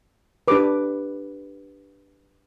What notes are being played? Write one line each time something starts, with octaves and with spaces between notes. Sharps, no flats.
D4 G4 B4 D6